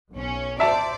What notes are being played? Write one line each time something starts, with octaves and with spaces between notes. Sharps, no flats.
B1 C#4
C5 D5 E5 A5